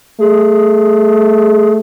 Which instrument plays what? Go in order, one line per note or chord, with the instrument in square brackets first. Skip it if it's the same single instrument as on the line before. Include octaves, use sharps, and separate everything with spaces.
[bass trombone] A3 [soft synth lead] G#4